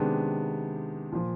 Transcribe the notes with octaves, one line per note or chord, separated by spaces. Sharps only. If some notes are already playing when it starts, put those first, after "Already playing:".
Already playing: C3 D#3 G#3 B3 D4
A#2 F3